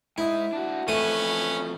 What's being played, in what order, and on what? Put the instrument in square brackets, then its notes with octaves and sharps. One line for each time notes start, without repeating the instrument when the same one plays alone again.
[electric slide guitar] G#3 D#4 D#5 [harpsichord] E4
[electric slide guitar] D4 F#4
[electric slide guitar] F2 E3 F3 [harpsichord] A3 D#6 [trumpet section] C#4 B4